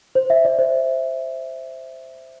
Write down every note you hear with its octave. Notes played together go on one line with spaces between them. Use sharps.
C5
E5
D5
C5